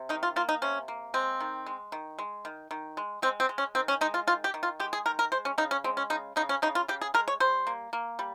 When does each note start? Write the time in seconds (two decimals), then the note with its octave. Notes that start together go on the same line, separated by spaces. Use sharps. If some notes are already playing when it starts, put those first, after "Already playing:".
Already playing: C3
0.09 D#3 D#4
0.23 F4
0.36 A#3 F4
0.49 D#4
0.62 C3 C#4
0.88 A#3
1.14 G#3 C4
1.40 D#3
1.66 G#3
1.92 D#3
2.19 G#3
2.45 D#3
2.71 D#3
2.97 G#3
3.22 G#3 C4
3.40 C4
3.49 G#3
3.58 C#4
3.75 D#3 C4
3.88 C#4
4.01 G#3 D#4
4.14 F4
4.27 D#3 F4
4.44 G4
4.54 D#3
4.63 F4
4.80 G#3 G4
4.93 G#4
5.06 D#3 A#4
5.19 A#4
5.32 G#3 C5
5.45 C#4
5.58 C#3 D#4
5.71 C#4
5.84 G#3 C4
5.97 C#4
6.10 C#3 D#4
6.36 C#3 D#4
6.49 C#4
6.62 C#3 D#4
6.75 F4
6.88 C#3 G4
7.01 G#4
7.14 G#3 A#4
7.28 C#5
7.40 G3 C5
7.67 A#3
7.93 A#3
8.19 G3